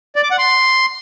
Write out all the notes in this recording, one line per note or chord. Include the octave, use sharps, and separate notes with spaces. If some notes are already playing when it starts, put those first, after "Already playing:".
D5
D6
F#5
C6